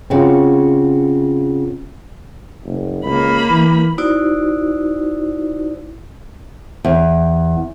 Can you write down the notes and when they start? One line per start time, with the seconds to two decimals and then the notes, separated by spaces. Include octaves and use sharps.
0.10 C#3 C4 C#4 F4 F#4
2.65 F#1
3.05 C#2 A#3 B5
3.50 E3
3.98 D#4 E4 F#4 C5 D5
6.85 E2